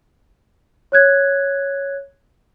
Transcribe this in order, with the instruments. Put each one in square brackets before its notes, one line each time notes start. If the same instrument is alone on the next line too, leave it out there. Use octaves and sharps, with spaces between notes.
[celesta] C#5 F#6 G#6